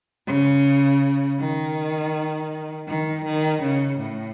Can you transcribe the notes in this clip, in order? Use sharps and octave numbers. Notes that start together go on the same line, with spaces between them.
C#3
D#3
D#3
D#3
C#3
A2